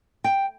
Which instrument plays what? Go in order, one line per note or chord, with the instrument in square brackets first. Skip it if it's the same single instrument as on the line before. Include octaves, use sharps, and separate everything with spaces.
[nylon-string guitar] G5